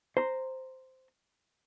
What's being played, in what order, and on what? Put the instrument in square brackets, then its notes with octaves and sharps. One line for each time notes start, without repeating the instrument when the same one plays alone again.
[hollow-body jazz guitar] C5 A#5 C6